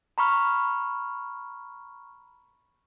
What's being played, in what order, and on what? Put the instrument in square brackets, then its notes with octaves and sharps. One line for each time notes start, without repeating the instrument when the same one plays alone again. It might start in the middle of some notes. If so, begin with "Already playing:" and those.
[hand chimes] A#5 B5 C#6 F6